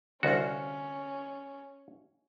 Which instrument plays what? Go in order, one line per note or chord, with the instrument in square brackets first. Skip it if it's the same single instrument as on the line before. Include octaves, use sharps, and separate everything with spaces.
[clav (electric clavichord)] C2 F#4 [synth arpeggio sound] D3 F5 [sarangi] C#4